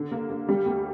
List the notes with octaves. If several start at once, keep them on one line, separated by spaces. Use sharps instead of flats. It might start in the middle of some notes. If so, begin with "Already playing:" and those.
Already playing: D3
A#3
A#3
G3
D2